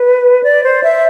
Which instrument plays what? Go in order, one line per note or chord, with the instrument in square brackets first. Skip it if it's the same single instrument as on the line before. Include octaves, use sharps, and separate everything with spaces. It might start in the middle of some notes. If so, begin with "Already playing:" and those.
Already playing: [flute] B4
D5
C5
E5